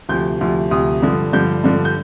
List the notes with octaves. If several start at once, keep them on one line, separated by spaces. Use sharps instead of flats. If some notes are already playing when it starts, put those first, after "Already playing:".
D2 C3 F3 G6
D2 C3 F3
D2 C3 F3 D#6
G2 D3 F3
G2 D3 F3 G6
G2 D3 F3
G6